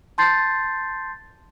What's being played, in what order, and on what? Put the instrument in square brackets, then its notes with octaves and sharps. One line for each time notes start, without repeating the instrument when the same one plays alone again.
[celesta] A5 C6 G6 A6 C7